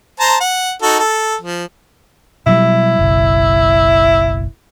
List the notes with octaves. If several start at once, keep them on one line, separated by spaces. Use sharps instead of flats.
C5 A5 A#5
F#5
D#4 F#4 A4
A4
F3
B2 F#3 G3 E4
F#1 B1